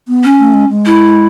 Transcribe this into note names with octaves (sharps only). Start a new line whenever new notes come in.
B3
C#4
A3
G#3
G#3
E4